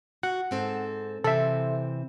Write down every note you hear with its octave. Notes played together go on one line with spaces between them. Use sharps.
F#4 F#5
G#2 C4 A4
C3 E3 C4 A4 E5